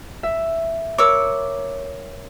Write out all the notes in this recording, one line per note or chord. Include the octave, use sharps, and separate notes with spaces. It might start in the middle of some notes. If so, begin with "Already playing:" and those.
E5
A#4 C#5 D6 E6